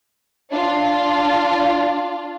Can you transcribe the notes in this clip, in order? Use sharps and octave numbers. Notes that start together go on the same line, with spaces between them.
D4 F4